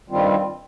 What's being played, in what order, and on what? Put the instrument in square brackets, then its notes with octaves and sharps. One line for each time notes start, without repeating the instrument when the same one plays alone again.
[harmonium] G2 D#3 G3 C4 F4